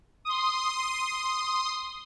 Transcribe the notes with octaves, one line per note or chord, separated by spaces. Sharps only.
C6 D#6